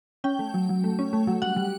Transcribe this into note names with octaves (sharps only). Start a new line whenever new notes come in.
C#4 G5
A3
F#3
F#3
A3
C#4
A3
F#3
G3 F#5
G3